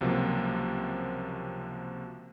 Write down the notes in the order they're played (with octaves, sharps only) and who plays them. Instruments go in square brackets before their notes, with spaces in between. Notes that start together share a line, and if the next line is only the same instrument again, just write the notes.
[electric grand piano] C#2 C3 F3 F#3 A#3